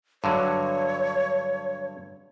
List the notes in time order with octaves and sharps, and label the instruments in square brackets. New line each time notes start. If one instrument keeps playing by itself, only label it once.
[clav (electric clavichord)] G2 D3 F#3 [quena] C#5